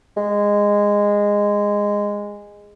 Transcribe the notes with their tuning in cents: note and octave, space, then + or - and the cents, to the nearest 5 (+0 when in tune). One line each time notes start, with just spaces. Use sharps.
G#3 -15